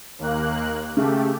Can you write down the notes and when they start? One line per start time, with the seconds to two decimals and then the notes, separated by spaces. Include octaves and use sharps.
0.19 D#2 A#3 F#6
0.97 C#3 A3 G4